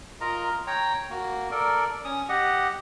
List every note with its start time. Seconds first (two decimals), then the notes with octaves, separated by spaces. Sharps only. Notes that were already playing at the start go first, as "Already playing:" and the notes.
0.21 F4 A#4 D#5 A#5
0.67 C#5 G5 A#5
1.10 A#3 F#4
1.51 A4 A#4 D5
2.04 C#4 D#6
2.29 G4 D#5 F#5